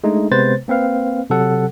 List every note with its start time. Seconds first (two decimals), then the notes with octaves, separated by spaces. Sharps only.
0.04 G#3 A3 D4 D#4
0.31 C3 G#3 B3 B4 C5 A6
0.68 A#3 C4 B4 F5
1.30 C3 F#3 A4 F#5